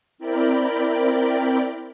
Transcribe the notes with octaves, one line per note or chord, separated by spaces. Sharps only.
C4 E4 A#4 D5 G5 B5